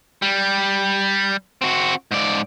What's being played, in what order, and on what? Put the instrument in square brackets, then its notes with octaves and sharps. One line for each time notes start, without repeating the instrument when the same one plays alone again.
[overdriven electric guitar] G3
C4 F#4
G#2 D5